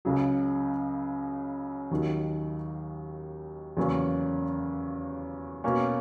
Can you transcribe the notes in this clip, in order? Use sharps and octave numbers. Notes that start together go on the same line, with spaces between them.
C#2 C#3 F#3
D#2 D#3 F#3
E2 C#3 F#3 A#3 C#4
B2 A#3 C#4